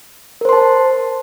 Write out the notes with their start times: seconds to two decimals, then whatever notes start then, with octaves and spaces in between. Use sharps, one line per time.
0.41 A#4
0.45 C5
0.49 C6
0.53 A5